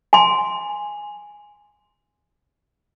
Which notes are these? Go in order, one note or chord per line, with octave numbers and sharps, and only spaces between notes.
G#5 C6